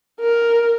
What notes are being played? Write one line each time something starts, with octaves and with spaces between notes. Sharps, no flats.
A#4